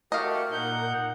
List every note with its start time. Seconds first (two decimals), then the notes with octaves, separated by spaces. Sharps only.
0.12 A3 F#4 G4 A#4 D#5 F5
0.52 A#2 D#4 F#5 G6